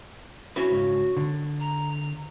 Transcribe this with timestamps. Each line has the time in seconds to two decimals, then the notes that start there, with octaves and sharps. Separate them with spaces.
0.56 C#4 E4 F#4 B4
0.70 C#2 G#2 C#4
1.17 D3
1.60 A#5